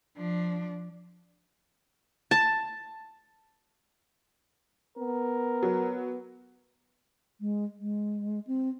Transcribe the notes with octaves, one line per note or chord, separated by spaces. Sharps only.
F3 D4
A5
B3 A#4
F#3
G#3
G#3
C4